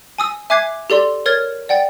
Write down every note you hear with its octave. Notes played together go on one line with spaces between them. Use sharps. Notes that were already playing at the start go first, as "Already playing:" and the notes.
G#5 D#6 E6
E5 G#5 D6 F#6 G#6 C7
G4 A4 D5 C6
A#4 C#5 F6 G#6 A6
D5 F#5 G5 A6